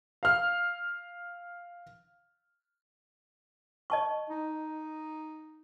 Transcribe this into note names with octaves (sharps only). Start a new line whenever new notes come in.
F5 F6
D#5 A5 C#6
D#4